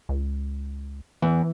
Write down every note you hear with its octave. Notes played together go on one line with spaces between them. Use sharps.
C#2
E2 E3